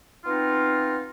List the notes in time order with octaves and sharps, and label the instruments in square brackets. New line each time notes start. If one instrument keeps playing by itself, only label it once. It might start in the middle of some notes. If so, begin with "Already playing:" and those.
[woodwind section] B3 C4 D#4 F4